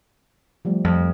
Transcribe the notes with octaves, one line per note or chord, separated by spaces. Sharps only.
F3 G3 A3
F2